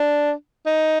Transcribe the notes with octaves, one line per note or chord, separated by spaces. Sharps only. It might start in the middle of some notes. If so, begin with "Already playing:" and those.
Already playing: D4
D#4